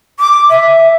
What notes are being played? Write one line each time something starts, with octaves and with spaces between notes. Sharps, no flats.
D6
E5